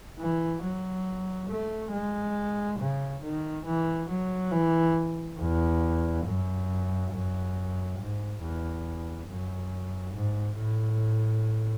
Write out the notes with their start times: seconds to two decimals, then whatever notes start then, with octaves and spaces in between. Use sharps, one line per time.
0.19 E3
0.63 F#3
1.50 A3
1.92 G#3
2.79 C#3
3.23 D#3
3.66 E3
4.09 F#3
4.52 E3
5.39 E2
6.25 F#2
7.12 F#2
7.99 G#2
8.41 E2
9.28 F#2
10.15 G#2
10.57 A2